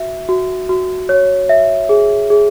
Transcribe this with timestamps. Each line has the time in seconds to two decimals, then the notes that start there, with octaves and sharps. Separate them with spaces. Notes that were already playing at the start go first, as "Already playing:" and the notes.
Already playing: F#4 E5
0.29 F#4
0.69 F#4
1.09 C#5
1.49 E5
1.89 G#4
2.30 G#4